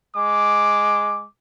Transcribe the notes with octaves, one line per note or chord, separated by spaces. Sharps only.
G#3 D6